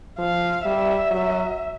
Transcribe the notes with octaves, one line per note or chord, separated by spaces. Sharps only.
F3 F5
G3 E5
F#3